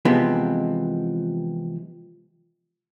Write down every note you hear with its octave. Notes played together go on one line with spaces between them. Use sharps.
C3 E3 F3 G#3 B3 C4